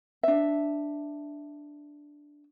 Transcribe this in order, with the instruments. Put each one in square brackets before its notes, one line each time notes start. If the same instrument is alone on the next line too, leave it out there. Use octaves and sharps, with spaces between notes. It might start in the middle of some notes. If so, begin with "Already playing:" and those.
[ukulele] D4 E5